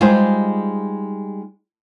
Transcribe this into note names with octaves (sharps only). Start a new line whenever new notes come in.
G3 G#3 D#4 F4 G#4 C5